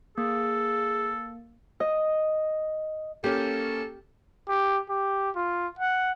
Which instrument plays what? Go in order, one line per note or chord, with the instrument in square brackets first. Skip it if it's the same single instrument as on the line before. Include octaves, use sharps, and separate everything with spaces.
[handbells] A#3 [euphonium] G#4 [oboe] A4
[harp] D#5
[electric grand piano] A#3 C#4 [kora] G4 [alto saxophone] A4
[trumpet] G4
G4
F4
F#5